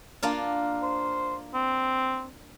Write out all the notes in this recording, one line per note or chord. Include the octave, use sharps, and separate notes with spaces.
A#3 D4 F4
C5
C4